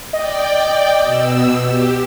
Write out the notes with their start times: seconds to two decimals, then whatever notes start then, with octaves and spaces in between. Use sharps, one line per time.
0.13 D5 D#5 G5
1.03 B2 E6
1.65 G4